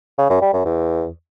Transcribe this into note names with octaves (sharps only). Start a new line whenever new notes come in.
C#3
F#2
G3
F#2
E2